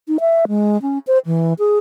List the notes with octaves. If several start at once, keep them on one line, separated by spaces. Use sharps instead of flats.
D#4
E5
G#3
C#4
C5
E3
G#4